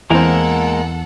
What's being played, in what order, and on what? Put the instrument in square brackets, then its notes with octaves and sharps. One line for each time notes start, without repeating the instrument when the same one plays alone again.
[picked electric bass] E2 [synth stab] E3 C4 [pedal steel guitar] G#3 A#3 A#4 [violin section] A4 F#5